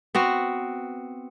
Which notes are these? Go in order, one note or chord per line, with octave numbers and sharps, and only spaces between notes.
B3 C4 F#4